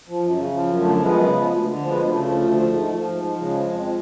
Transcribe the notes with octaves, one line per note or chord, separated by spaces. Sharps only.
F3
F#2
C#3
F3
F#2
D3 A3
F3
G#3 B3
F#2
C#3
F3
D2
D3
F3
G#3 B3
D2
C#3 A3
F3
D2
F3
G#2
F3
F3
G#2
F3
C#3 G#3
F3
F2
F3